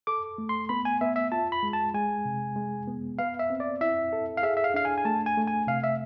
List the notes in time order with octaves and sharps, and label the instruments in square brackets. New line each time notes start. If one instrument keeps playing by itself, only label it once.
[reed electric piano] A4 [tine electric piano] D6
[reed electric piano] A3
[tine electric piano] C6
[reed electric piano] B3 [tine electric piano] B5
[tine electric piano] G#5
[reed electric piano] B3 [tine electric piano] E5
[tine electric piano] E5
[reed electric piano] F4 [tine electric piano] A5
[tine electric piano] B5
[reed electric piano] G#3
[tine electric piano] A5
[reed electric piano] G#3 [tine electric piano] G#5
[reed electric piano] C3
G#3
B3
[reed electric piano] B4 [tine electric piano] F5
[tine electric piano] E5
[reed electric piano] C4
[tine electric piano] D5
[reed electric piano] E4 [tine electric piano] E5
[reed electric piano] A4
[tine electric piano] F5
[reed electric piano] G#4 [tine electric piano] E5
[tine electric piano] E5
F5
[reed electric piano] D4 [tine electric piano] F5
[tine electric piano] G#5
G#5
[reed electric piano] A3 [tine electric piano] A5
[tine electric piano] G#5
[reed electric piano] A3
[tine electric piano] G#5
[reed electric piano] C3 [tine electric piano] F5
[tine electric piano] E5